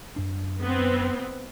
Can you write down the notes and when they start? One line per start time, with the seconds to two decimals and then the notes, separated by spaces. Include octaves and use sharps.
0.16 F#2 D4
0.60 B3 C4